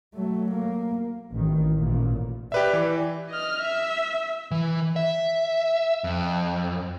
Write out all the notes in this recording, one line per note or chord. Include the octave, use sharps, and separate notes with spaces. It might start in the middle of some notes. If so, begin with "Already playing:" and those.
F#3 A3
A#3
A1 D#3
A1 A#2
G4 B4 D5 E5
E3
D#5 F6
E5
E3
E5
F2